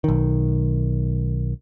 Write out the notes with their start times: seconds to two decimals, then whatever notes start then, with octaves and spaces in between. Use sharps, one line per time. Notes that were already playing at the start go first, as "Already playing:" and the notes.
0.04 B1 D#3